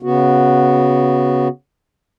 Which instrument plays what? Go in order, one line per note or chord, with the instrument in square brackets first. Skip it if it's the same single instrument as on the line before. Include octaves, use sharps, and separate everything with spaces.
[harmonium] C#3 B3 F#4